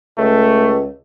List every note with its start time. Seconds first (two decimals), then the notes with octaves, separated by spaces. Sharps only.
0.18 C#2 A3